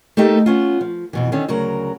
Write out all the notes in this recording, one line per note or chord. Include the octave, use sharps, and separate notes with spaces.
A3 A#3 D#4 G4 A4
B3 C#4 F4
F3
F2 B2 E3
D3 D#3 C#4
D2 C#3 F#3 A#4